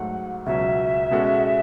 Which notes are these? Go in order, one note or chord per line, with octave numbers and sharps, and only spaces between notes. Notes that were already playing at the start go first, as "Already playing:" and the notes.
Already playing: G#2 F#3 A3 F#5
C#2 B2 F#3 E5
B2 G#3 C#4 F#4 A4